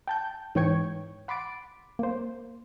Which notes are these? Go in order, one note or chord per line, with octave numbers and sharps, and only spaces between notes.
G5 A5 G6
G#2 E3 C#5 G5 C#6 G#6
F#5 B5 C6 D6 A6 D7
A#3 C5